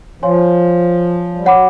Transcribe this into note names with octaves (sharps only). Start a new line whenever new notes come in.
F3 C#5 F5 G#5 C6
G3
F#3 C#5 F#5 B5 D6